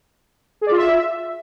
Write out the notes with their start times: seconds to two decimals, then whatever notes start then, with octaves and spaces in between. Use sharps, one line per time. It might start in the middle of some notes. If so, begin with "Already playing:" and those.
0.61 G#4
0.67 D5
0.72 F4
0.77 E5